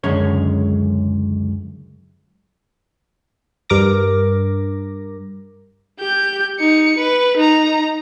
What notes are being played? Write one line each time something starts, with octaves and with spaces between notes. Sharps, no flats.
C#2 F#2 D3 G#3 C#4 C#5
G2 A#4 D6 A#6
G4 G6
D#4 C#7
B4
D#4 A#5